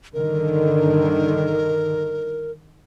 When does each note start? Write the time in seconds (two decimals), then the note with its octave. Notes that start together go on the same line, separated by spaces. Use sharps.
0.14 G2 D3 D#3 A#4